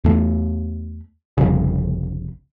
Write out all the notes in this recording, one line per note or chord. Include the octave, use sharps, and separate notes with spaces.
E2 A3
G1 C2 F2 C#3